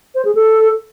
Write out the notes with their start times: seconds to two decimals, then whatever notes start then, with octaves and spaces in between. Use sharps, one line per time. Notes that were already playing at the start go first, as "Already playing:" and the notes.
0.15 C5
0.25 G#4
0.35 A4